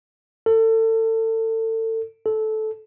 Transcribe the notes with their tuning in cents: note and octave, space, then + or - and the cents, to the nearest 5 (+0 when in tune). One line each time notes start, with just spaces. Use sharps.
A4 +30
A4 -15